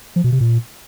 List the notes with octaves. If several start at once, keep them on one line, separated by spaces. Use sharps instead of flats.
F3
B2
C3
A#2